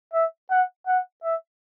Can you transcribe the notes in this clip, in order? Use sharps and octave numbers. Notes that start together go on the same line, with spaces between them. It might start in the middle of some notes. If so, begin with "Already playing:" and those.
E5
F#5
F#5
E5